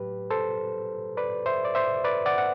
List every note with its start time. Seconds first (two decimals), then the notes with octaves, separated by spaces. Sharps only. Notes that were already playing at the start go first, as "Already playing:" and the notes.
Already playing: A2 F#3 G4 B4
0.30 A4 C5
1.17 B4 D5
1.46 C5 E5
1.65 D5
1.75 C5 E5
2.04 B4 D5
2.26 D5 F#5
2.38 F#5